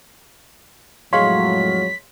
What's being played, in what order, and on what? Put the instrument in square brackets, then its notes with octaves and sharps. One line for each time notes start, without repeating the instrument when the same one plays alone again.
[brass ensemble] F2 A2 F#3 [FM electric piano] G#3 C#5 [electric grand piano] F5 C6 [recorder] B6